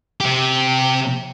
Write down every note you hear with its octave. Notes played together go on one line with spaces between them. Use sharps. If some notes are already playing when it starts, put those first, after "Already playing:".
C3 G4